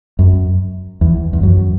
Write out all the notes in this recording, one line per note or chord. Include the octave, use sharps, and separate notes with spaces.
F#2
E2
E2
F#2